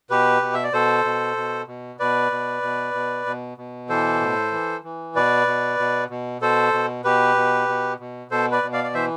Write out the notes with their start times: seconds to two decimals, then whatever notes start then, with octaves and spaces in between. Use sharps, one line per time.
0.10 B2 G4 B4
0.42 B2
0.54 E5
0.63 D5
0.73 B2 A4 C5
1.05 B2
1.37 B2
1.68 B2
2.00 B2 B4 D5
2.31 B2
2.63 B2
2.94 B2
3.26 B2
3.58 B2
3.89 E3 A4 C5
4.21 A2
4.52 E3
4.84 E3
5.16 B2 B4 D5
5.47 B2
5.79 B2
6.10 B2
6.42 B2 A4 C5
6.73 B2
7.04 B2 G4 B4
7.36 B2
7.69 B2
8.00 B2
8.31 B2 A4 C5
8.52 B4 D5
8.63 B2
8.73 D5 F5
8.84 D5
8.94 E3 C5 E5